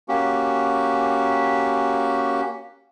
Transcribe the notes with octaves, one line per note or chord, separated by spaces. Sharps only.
A#3 C#4 F#4 G4